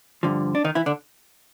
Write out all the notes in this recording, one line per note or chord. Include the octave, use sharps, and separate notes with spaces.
G2 D3 F3
D4
D#3 D#4
E3 E4
D3 D4